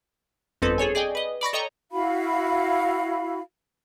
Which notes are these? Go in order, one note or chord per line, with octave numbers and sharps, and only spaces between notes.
G1 F2 C4 A4 B4
G#4 A4 C#5 G#5
G#4 D5 D#5 G5 G#5
B4 D#5
D5 B5 C#6 A#6
A4 C#5 D#5 G5 A#5
E4 F#4 F5 B5